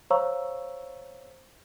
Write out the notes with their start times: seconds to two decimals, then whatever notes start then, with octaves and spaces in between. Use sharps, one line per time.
0.10 C5 C#5 F5 A#5 C#6 E6